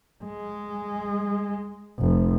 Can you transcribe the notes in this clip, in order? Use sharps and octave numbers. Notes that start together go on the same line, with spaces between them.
G#3
F1